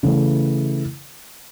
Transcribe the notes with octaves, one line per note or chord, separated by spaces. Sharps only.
C#3 E3 A3